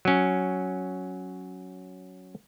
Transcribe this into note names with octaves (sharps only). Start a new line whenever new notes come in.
F#3 C#4